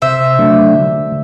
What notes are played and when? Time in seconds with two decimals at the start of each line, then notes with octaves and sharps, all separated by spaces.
0.02 C3 C5 E5
0.39 F#3 A3 D4
0.75 D3